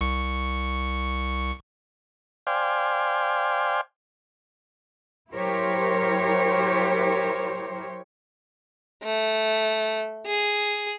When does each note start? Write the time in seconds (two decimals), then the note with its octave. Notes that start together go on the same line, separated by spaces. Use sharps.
0.01 C2 C#6 C#7
2.47 C5 D5 F5 G5 G#5
5.33 F#3 E4 G4 A#4 C5 C#5
9.03 A3
10.26 G#4